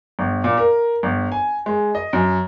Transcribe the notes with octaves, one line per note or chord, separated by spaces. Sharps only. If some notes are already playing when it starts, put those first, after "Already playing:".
G1
A#2
A#4
G1
G#5
G#3
D#5
F#2